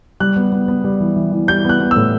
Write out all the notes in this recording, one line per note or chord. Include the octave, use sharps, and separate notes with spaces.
G3 F#6
B3
B3
B3
G3
E3
E3
E3
G3 G6
B3 F#6
B3
E6
A2